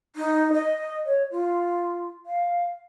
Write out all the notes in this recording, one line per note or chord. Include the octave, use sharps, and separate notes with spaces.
D#4
D#5
C#5
F4
F5